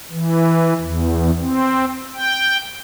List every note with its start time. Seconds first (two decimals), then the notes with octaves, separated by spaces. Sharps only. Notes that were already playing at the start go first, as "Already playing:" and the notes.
0.12 E3
0.81 E2
1.39 C4
2.14 G5